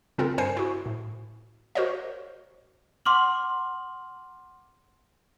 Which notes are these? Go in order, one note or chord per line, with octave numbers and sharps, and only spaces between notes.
C#3 C4 F4 A4 A#4
G2 A#4 C5 G#5 C7
E4 F#4
A2
F#4 A#4 C5 C#5 D#5
F#5 C6 D6 F6 F#7